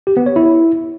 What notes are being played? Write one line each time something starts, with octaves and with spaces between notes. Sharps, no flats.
G4
B3
C#5
E4